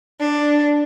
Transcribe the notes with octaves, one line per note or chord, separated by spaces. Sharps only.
D4